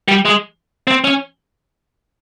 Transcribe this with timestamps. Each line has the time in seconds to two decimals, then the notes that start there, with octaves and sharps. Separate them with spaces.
0.08 G3
0.25 G#3
0.87 C4
1.04 C#4